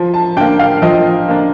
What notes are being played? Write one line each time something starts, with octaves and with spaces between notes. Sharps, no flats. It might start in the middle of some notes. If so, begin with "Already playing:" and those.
Already playing: F3
A5
A#3 D4 G5
F5
F3 D#5
A#3 D4